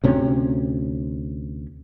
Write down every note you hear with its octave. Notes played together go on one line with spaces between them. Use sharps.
D2 C3 C#4